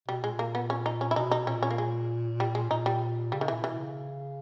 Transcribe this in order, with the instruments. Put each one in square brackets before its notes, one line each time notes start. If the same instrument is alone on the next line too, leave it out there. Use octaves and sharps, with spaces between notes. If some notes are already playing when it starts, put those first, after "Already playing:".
[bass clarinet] B2 [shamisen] G3
[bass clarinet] A#2 [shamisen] G#3
[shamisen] A#3
B3
C#4
D#4
C#4
E4
[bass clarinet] B2 [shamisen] D#4
[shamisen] D#4
[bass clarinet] A#2 [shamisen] C#4
[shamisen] C#4
A#3
G#3
G3
G#3
[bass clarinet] A#2 [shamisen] D#4
[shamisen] G3
[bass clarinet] C#3 [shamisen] G3
[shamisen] D#3
E3
[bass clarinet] A#2
[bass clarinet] B2 [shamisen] E3
[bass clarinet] C#3